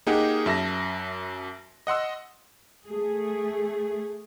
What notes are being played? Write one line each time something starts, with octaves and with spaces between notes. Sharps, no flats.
A#3 D#4 G4 G#4 A#4 F#5
F#2 E5 A5 A#6
D#5 F#5 C6 E6
A3 G#4